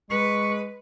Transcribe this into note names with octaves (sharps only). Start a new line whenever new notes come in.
G#3 B4 C#6